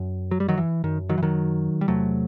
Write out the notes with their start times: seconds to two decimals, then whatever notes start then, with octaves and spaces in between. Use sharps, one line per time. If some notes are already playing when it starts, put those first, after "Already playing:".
Already playing: F#2
0.31 F#3
0.40 G3
0.48 D#3 F#3
0.58 E3
0.84 F#2 D#3
1.09 D#3 F#3
1.18 E3
1.23 D#3 F#3
1.81 G3
1.88 E2 C3 F#3 A3